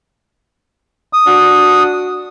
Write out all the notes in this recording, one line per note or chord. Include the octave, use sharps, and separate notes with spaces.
D#6
D4 F#4